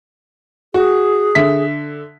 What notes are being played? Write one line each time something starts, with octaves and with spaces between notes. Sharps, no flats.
F#4 G#4
D3 E5 B6